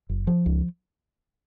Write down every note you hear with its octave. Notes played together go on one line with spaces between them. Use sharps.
F#1
F3
C#2